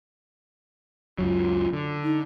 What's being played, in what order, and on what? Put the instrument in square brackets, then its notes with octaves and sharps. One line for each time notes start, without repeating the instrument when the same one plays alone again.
[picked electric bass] C#2 F#2 F#3 [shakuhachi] F4
[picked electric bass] D3
[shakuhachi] D#4